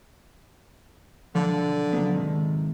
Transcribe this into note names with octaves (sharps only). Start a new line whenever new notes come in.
B1 D3 F3
C#3 F#3 B3
G#2 C3 D#3